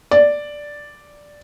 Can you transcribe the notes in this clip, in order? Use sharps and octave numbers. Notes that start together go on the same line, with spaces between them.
D5